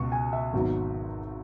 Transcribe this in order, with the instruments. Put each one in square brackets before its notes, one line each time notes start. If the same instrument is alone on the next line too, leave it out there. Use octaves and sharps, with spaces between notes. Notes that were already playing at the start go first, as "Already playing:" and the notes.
Already playing: [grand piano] C#2 B2 B3 C#6
G#5
E5
G#1 G#2 F#3 B3